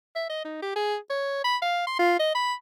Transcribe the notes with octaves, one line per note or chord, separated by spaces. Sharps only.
E5
D#5
D#4
G4
G#4
C#5
B5
F5
C6
F4
D#5
B5